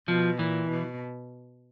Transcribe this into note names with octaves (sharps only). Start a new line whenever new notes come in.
B2 F3
A#2 E3
B2